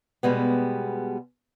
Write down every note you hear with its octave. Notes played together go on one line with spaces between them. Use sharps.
B2 G3 G#3 B3